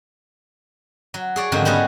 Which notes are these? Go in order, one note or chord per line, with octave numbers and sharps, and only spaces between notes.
F#3
G#4 C#5 D5
G#2 D3 D#3 F3 F#3 C4
G3 B3 C#4 F#4 G#4